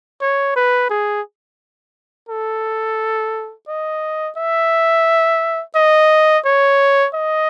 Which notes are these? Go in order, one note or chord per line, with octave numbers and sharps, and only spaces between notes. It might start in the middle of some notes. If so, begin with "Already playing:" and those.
C#5
B4
G#4
A4
D#5
E5
D#5
C#5
D#5